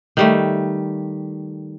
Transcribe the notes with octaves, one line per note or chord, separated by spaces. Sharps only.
D#3 G3 A3